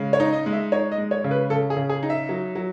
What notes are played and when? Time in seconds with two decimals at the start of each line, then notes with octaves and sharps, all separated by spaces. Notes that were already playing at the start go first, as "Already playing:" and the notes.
Already playing: C#3 G#3
0.13 C#5
0.20 D#4
0.33 D#5
0.46 G#3
0.53 E5
0.72 D#4 C#5
0.92 D#5
0.98 G#3
1.11 C#5
1.24 C#3
1.31 B4
1.50 C#3 A4
1.70 G#4
1.77 C#3
1.89 G#4
2.03 D#4
2.10 E5
2.29 F#3
2.55 F#3